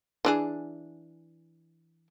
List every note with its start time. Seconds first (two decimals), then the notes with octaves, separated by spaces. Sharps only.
0.25 E3 D4 G#4